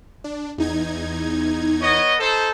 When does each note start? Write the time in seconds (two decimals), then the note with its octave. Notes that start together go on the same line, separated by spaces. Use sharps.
0.24 D4
0.58 E2 D#4 G#6
1.81 B3 C#5 D#5
2.18 D#4 A4 C5